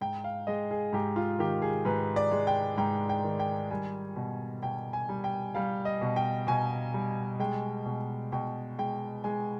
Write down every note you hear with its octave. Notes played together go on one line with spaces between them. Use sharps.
G#2 G5
F5
G#3 D#5
G#4
G#2 G4
F4
D#3 G4
G#4
G#2 B4
D5
G#3
G5
G#2 G5
G5
D#3
G5
G3 G#5
B2
B2 G5
G#5
G3
G5
G3 F5
D#5
B2
G5
B2 G#5
G3
G#3 G5
B2
B2 G5
G#3 G5
G#3 G#5